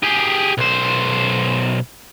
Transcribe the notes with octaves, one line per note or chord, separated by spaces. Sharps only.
G4 G#4
B1 C5